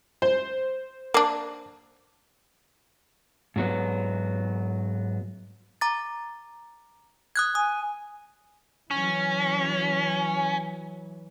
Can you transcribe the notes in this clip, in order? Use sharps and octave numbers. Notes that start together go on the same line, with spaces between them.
C5
A#3 D4
G#2 F#3 B3
A#5 D6 A6
D#6 F#6 G#6
G#5 D#6
E3 F#3 C#4